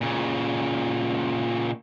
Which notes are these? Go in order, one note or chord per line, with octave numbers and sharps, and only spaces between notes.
A#2 C#3